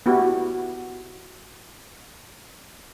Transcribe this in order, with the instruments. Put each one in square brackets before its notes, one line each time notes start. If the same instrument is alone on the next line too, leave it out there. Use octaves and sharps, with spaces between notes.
[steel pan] B3 E4 F#4 G4